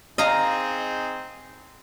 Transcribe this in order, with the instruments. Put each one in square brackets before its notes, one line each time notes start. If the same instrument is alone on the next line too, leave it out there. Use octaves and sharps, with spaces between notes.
[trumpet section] C4 D#4 G#4 [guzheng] D#5 F5 A#5